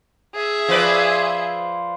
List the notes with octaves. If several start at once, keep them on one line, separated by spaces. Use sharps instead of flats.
G#4 E5
F3 B4 D5